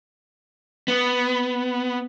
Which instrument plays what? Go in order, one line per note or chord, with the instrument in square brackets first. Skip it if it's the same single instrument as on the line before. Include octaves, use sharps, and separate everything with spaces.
[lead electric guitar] B3